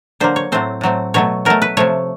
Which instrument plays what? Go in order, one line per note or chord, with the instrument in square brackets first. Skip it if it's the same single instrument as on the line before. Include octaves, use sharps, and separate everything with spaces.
[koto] D3 F#3 A#3 C5
C#5
A2 F#3 A3 C4 C5
A2 F#3 A3 C4
B2 F#3 A3 C#5
B2 F#3 A3 A#4
B4
C3 F3 A3 C#5